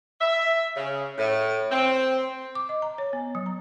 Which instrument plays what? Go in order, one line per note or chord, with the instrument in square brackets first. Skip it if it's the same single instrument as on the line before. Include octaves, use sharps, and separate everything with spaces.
[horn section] E5
C#3
A2
C4
[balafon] D6
D#5
A#5
C#5
B3
F#3
A#5